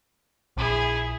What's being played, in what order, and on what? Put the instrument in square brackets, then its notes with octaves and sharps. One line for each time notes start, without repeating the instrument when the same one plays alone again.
[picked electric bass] A#1 [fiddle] E4 G#4